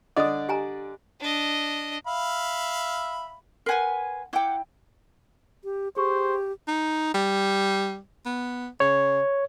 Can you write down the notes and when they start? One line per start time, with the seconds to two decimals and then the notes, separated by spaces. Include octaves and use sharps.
0.16 D3 D5 D#5 D#6
0.49 G4 G#5 A#5
1.20 D4 D#5
2.07 E5 F5 B5
3.66 A#4 B4 F#5 G#5 C6
4.33 E4 F#5 G5 D6 G6
5.64 G4
5.97 G4 G#4 C5 C#6
6.68 D#4
7.14 G3
8.25 B3
8.80 C#3 C#5